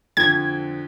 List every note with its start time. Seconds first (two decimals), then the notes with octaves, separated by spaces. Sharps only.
0.17 F2 D3 F3 G#6